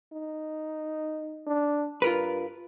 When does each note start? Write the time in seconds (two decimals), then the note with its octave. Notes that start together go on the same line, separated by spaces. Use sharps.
0.13 D#4
1.47 D4
2.02 G2 F4 A#4 B4